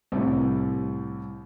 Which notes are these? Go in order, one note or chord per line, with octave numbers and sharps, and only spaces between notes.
C2 A2